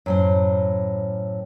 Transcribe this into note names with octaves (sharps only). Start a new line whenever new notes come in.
F#2 A2 C5